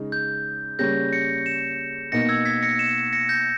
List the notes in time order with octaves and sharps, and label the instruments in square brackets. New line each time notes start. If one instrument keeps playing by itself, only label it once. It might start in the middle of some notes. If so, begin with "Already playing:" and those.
Already playing: [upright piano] C#3 G#3 D#4
[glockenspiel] G6
[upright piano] C#3 G3 A#3 C#4 [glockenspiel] G6 A#6
[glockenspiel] A#6 C#7
C#7 E7
[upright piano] B2 A#3 D#4 [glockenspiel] A#6 C#7
[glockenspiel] E6 G#6
G#6 B6
A#6 C#7
C#7 E7
A#6 C#7
G6 A#6